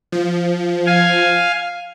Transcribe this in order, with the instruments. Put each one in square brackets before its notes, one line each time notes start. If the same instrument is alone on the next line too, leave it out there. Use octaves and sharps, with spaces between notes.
[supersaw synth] F3
[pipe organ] F5 G#5